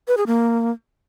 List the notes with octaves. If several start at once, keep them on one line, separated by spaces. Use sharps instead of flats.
B4
G#4
A#3